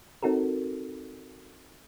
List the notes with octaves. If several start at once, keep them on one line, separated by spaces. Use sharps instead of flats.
C4 D#4 F#4 A4 A#4